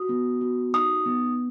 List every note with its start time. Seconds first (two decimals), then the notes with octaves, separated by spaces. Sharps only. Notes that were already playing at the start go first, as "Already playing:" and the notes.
Already playing: F#4 D#6
0.09 B3
0.41 F#4
0.74 D#4 D#6
1.06 B3